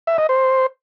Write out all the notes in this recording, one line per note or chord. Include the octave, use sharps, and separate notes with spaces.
E5
D#5
C5